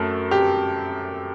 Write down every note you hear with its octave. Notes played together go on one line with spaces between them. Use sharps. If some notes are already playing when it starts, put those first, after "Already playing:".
Already playing: F#2 A3 C#4
G4